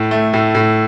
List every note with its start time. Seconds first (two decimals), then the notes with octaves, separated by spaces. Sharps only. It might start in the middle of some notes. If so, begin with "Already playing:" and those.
Already playing: A2
0.11 A3
0.33 A2
0.55 A2